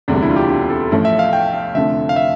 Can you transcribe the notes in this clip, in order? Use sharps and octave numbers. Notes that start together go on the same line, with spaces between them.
E1 D2 C3 G3 D4
E4
F4
G4
G4
A4
A1 A2 F3 A3
E5
F5
G5
F5
F1 F2 D3 F3 A3 E5
F5
E5